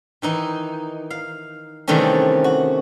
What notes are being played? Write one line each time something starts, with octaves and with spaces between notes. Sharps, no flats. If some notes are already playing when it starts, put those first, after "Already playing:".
D#3 E3 D#4
F5
C3 D#3 E3 G3 A3 C#4
F#4